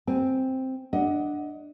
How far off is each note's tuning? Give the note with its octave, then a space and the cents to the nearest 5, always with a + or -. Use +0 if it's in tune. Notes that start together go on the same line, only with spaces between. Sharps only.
C4 +0 G#5 +0
D4 +10 D#5 +25 F#5 +0